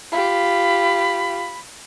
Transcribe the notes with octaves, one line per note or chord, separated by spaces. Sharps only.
F4 G4 B5